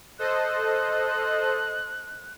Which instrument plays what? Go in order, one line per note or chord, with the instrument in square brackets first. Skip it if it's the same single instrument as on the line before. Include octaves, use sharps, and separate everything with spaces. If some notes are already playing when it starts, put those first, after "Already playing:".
[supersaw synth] A4 C5 D#5 [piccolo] F#6